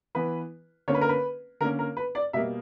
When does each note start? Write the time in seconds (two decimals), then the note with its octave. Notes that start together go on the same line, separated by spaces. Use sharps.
0.15 E3 B3 B4
0.88 D3 A#3 C#4 C#5
0.94 B4
1.01 A#4
1.09 B4
1.60 D3 A#3 C#4 A#4
1.79 A#4
1.97 B4
2.15 D5
2.33 B2 G3 A#3 E5